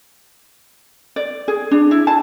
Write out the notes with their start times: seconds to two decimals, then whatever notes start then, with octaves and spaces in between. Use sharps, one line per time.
1.16 D5
1.48 G#4
1.71 D4
1.91 E4
2.07 A5